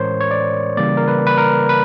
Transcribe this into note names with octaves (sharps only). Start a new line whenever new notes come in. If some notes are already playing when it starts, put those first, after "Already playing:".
Already playing: A2 E3 G#3 C#4 A#4 C5 C#5
C#5
D5
C#3 E3 G3 A#3 D5
A#4
B4
B4
A#4
B4